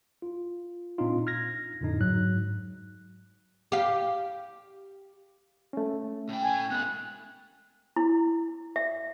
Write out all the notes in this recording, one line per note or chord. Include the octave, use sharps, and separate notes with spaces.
F4
A#2 C4 D4 D#4 F4
F6 G#6 A#6
F2 A2 D3 D4 D#4
G#2 F#3 F#6
G4 F5
A3 C#4
A2 G5
G#5
G#3 B3 F#6
E4
E5